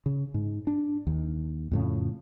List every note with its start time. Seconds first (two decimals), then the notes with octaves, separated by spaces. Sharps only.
0.06 C#3
0.34 G#2
0.67 D4
1.07 D#2
1.72 F2 A2 C#3